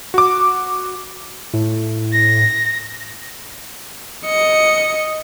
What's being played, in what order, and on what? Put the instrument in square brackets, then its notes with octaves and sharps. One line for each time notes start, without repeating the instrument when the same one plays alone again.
[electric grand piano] F#4 D6
[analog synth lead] A2
[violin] A#6
[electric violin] D#5 C#7